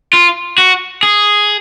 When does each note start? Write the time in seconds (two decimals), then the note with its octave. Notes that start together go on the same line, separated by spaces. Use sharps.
0.13 F4
0.58 F#4
1.03 G#4